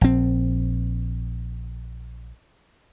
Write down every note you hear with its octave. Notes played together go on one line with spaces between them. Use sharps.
A#1 C4